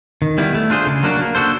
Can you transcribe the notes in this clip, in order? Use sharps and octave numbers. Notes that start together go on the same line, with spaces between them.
D#3
G3 B3 E4
A3
D4 F4 G#4 C5
C#3
F#3 A#3 D4 F#4
A#3
D4 F#4 A4 C5